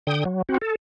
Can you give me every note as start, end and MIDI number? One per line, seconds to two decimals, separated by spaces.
0.07 0.24 50
0.07 0.24 79
0.07 0.24 87
0.25 0.42 54
0.49 0.58 60
0.49 0.58 66
0.62 0.75 69